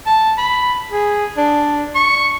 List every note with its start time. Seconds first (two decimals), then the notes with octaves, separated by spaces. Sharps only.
0.06 A5
0.38 B5
0.92 G#4
1.37 D4
1.95 C#6